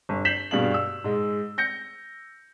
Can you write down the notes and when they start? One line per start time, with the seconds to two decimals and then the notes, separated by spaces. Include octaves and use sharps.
0.09 G1
0.25 G6 B6 C7 E7 F#7
0.51 G2 B2 G3 G#4 F5 F#7
0.74 E6
1.04 G#2 G#3
1.58 G6 A#6 C#7